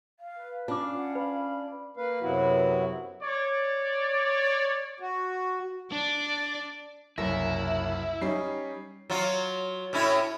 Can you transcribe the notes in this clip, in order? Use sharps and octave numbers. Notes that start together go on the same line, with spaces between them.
F5
B4
C#4 D4 F4 D5 F5 D6
F#5
B4 B5
A#3 B4 F5
F#2 C3 F#3 B3 E4 F#4
C#5 D5
F#4
D4 D5
F#1 C2 F#2 E4 A#6
G3 C#4 D#4 C7
F#3 F4
A2 C#4 E4